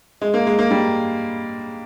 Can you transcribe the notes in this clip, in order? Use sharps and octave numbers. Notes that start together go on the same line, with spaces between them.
G#3
A#3
G#3
A#3
G3